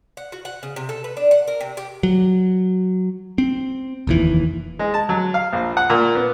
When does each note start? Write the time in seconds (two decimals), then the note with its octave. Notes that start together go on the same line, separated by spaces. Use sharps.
0.17 F#5
0.32 F#4
0.45 F#5
0.63 C#3
0.76 C3
0.89 A4
1.04 B4
1.17 D4
1.31 F#5
1.47 A#4
1.61 C3
1.77 G4
2.03 F#3
3.38 C4
4.07 F1 D#2 E3
4.79 G#3
4.94 A5
5.09 F#3
5.34 F5
5.53 A#1
5.77 F#5
5.90 A#2
6.15 B3